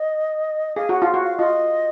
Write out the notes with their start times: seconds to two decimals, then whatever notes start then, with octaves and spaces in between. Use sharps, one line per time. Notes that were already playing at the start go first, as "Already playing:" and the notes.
Already playing: D#5
0.76 G#4 F5
0.89 F#4 F#5
1.02 F4
1.08 F5
1.14 F#4
1.22 F5
1.38 F4 D#5